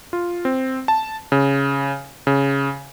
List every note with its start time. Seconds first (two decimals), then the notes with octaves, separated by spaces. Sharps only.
0.13 F4
0.45 C4
0.88 A5
1.32 C#3
2.27 C#3